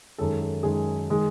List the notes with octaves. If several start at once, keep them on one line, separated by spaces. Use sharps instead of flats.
F#2 D#3 G#3 A4
A4
F#2 D#3 G#3 G#4
D#3 G#3